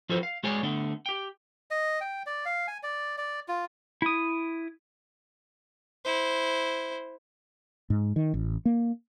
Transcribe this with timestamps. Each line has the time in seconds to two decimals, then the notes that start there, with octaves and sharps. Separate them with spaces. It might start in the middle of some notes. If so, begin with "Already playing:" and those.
0.09 F3 F4 F#4 A4 B4 C5
0.23 F5
0.43 G#3 F#4 G#4 C#5 D5 G#5
0.63 D3 A3 B3
1.06 G4 G5
1.71 D#5
2.01 G5
2.26 D5
2.45 F5
2.68 G#5
2.83 D5
3.18 D5
3.48 F4
4.02 E4 D#6
6.05 E4 C5
7.90 G#2
8.16 D#3
8.34 A1
8.65 A#3